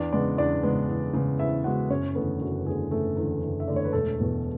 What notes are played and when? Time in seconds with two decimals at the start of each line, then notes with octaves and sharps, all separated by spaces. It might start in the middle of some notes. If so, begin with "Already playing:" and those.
Already playing: E2 D4 D5
0.12 C#3 G#3 B3 D4 D5
0.38 E2 D4 D5
0.63 C#3 G#3 B3
0.88 E2
1.14 C#3 G#3 B3
1.39 E2 E4 E5
1.64 C#3 G#3 B3 F#4 F#5
1.90 F#1 C#4 C#5
2.15 E2 D3 A3 B3 B4
2.40 F#1 F#4
2.66 E2 D3 A3 G#4
2.91 F#1 A3 A4
3.16 E2 D3 A3
3.43 F#1
3.60 E5
3.67 E2 D3 A3 D5
3.76 C#5
3.85 B4
3.93 E1 A3 A4
4.18 E2 B2